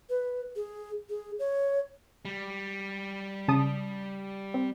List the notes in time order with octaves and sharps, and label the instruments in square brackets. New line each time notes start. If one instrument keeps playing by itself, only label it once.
[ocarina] B4
G#4
G#4
C#5
[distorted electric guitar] G3
[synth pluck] C#3 A5 D#6
C4